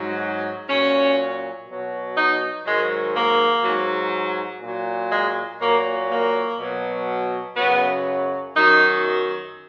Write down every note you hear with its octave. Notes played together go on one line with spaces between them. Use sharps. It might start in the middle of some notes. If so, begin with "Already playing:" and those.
Already playing: G#2 F#3
A#2 F#3 C#4
B2 F#3
D#4
G#2 D#3 F#3 G#3
A#3
G#2 F#3
A#2 F#3
G#3
A#2 F#3 A#3
A#3
B2 F#3
F#2 C#3 F#3 B3
F#2 D#3 F#3 D#4